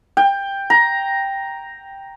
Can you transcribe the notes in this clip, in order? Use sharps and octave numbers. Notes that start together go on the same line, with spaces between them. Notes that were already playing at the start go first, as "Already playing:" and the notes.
G5
A#5